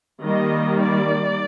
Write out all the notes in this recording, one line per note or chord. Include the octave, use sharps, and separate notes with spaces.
D#3 G3 A#3 D#5
D5